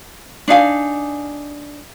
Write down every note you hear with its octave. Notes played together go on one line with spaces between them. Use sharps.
D4 D#4 F5 G#5